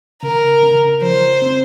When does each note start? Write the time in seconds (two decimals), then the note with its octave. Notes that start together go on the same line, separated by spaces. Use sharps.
0.22 C#3 A#4
0.63 C#3
1.02 F3 C5
1.42 C4